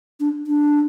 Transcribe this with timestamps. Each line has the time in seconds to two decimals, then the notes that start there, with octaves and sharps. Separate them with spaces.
0.20 D4
0.47 D4